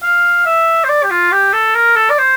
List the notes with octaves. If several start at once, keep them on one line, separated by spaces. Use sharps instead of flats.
F5
E5
C5
D5
G4
F4
G4
A4
A#4
A4
D5
C5